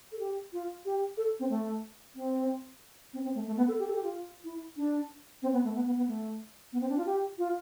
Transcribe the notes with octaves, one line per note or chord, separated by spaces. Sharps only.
A4
G4
F4
G4
A4
C4
A3
C4
C4
C4
A3
A3
B3
A4
G4
A4
G4
F4
E4
D4
C4
B3
A3
B3
B3
B3
A3
B3
C4
D4
F4
G4
F4